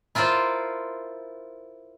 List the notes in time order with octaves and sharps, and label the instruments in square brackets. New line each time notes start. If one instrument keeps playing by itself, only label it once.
[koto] E4 F4 A#4 C5 D5